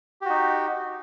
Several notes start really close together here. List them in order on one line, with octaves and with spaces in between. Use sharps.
G4 F#4 D#4